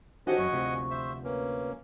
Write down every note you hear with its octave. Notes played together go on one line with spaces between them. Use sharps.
F#4 G4 A4 C5 C#5 D#5 F#5 G#5
F#2 C#4 C#6
D2 C3 F3
C5 E5
A#3 C#4 B4